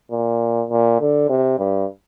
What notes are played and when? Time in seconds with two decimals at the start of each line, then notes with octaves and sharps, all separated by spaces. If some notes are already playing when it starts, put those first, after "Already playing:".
0.11 A#2
0.70 A#2
1.00 D3
1.29 C3
1.59 G2